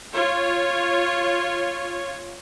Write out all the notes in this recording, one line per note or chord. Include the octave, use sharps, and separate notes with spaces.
F4 C#5